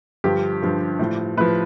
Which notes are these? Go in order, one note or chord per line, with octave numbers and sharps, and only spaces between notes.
G2 D3 F3 G4
G2 D3 F3
A2 F3
A2 F3 B4